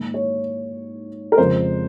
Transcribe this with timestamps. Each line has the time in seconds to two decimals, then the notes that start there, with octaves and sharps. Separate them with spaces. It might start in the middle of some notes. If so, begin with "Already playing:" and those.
Already playing: G#2 D#3 A#3
0.14 C#5
1.32 A#4
1.38 F2 C#3 F3 G#3 C5